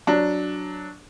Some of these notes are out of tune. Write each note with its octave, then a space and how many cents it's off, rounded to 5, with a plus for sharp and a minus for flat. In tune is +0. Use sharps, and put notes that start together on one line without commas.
F#3 +0 D4 +0